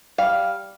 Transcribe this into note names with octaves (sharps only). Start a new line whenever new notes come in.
G3 F5